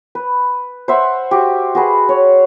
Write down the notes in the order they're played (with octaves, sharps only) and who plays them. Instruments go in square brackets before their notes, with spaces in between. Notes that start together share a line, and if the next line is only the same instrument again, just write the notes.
[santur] B4
C5 E5 F#5
F#4 G4
F#4 G#4 B4
C#5